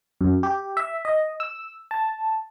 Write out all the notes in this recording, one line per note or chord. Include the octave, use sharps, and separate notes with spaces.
F#2
G4
E5
D#5
E6
A5